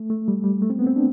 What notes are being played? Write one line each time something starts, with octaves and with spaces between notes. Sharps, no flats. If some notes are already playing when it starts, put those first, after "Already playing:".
Already playing: A3
A3
G3
G3
A3
C4
B3
C4
D4